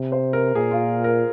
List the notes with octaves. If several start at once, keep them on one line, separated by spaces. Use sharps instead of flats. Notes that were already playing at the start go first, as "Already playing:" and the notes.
Already playing: C3
C5
A#4
A#2 G#4
F4
A#4